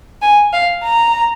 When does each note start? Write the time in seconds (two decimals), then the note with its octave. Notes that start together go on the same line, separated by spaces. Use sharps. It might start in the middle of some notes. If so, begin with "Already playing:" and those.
0.22 G#5
0.53 F5
0.84 A#5